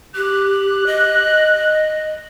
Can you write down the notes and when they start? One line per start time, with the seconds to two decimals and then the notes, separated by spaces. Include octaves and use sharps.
0.16 G4 F#6
0.86 D#5